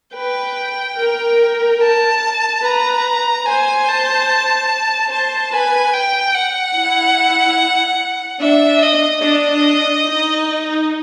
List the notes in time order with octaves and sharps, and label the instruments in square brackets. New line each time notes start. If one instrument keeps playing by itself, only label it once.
[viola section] B4 [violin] G5
[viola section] A#4
[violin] A5
[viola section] B4 [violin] A#5
[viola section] C5 [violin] G#5
[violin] A5
[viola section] C5 [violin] A5
[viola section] B4 [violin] G#5
[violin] G5
F#5
[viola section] E4
[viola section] D4 [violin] E5
[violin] D#5
[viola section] D4 [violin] D#5
[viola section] D#4